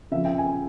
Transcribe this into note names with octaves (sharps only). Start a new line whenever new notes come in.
C#3 F3 E5
G5
G#5